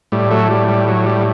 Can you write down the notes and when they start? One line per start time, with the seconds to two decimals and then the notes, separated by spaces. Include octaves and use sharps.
0.12 A2 G3
0.31 F#3 A3
0.50 G3
0.68 G3
0.88 F#3
1.06 G3